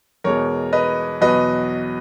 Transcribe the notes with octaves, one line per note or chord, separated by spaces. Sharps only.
E2 B2 G#3 A#4 C#5
B4 D#5
E2 B2 F#3 B4 D#5